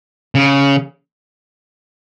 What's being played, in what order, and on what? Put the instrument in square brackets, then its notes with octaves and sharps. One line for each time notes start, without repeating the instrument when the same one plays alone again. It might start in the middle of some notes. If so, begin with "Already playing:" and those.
[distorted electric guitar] C#3